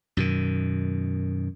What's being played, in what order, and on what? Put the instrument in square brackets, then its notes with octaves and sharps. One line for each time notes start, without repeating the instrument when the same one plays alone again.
[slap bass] F#2 B2 D#3